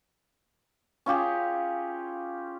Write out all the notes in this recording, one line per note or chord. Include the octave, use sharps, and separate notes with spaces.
C#4 F4 G4 G#4